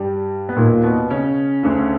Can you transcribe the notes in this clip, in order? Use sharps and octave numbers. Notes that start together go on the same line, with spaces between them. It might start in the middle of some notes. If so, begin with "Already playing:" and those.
Already playing: G2 G3
B3
D#2 A#2 D#3 A#3
B2 B3
C#3 C#4
D2 D3